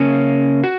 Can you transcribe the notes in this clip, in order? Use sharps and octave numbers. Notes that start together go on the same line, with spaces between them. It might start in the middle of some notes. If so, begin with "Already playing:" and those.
Already playing: C#3 A#3 C#4
F#4